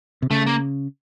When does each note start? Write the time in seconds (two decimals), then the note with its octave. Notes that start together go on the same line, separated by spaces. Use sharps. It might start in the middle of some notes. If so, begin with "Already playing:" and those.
0.22 C3
0.30 C#3 A3
0.46 A#3